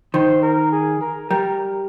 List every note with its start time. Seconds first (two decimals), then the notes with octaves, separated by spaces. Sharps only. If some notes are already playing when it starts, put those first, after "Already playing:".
0.14 D#3 C5
0.42 A#4
0.72 G#4
1.01 A#4
1.30 G3 A#4